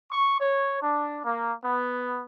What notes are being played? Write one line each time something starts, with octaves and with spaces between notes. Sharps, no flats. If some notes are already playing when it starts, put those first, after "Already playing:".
C#6
C#5
D4
A#3
B3